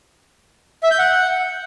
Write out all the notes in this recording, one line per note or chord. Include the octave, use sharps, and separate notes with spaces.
E5
G6
F#5